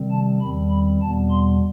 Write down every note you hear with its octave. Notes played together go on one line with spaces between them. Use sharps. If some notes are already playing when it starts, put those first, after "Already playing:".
Already playing: C3 D#3 G3 C4
A5
E2 D#3 G3 C4 B5
B5
E2 B2 G3 B3 A5
C6